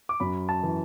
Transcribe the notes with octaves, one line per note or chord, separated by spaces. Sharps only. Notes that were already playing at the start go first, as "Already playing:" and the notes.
D6
F#2 B5
A5
E3